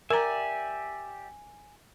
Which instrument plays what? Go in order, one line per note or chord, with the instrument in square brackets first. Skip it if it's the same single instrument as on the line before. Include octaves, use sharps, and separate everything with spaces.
[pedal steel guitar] G4 D5 E5 [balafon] A#4 A#5 [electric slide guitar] G#5